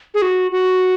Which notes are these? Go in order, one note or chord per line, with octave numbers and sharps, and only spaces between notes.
G#4
F#4
F#4